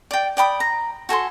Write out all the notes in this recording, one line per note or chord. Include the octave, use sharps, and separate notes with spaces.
D5 G5
D5 G5 B5 D#6
A#5
F#4 A4 G#5 C6